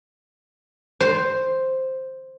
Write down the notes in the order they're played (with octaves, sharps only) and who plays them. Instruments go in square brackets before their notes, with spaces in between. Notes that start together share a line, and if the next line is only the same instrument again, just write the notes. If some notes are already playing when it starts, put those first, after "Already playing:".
[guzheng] C5